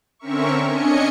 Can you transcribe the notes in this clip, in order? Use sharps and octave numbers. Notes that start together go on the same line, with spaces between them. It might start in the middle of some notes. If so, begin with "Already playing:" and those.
D3 C4 C#4 A#4 E5 C#6
C#4 D4 D#5 G#5 C#7